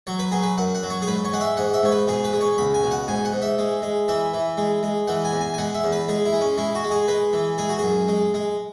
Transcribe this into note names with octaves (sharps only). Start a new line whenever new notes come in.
F#3 C#5
B4
F#3 G#4
B4
F#2 F#5
F#5
F#3
C#5
G#4
G#2 B4
C#5
G#3 F#5
E5
G#2 F#5
E5
G#2 C#5
B4
B2 G#4
B4
G#3
C#5
C#2 B5
G#5
B2
F#5
G#2 G#5
F#5
G#2
E5
G#3
G#3
E3 E5
E3
G#3
G#3
E3 F#5
G#5
E2
G#5
G#5
G#3 F#5
E5
E2
B4
G#3 G#4
E4
G#3
C#4
G#3 E4
F#4
G#3
G#4
G#3 B4
E3
G#3 G#4
F#4
F#2 G#4
G#3
G#3